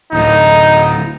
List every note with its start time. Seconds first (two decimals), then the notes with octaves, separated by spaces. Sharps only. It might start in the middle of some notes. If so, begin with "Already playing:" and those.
0.13 D1 D2 D#4